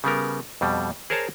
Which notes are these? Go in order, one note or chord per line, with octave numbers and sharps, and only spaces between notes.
C#3 G3 B3 A#4
F2 B2 G3
G#4 A#4 C5 C#5 A5 A#5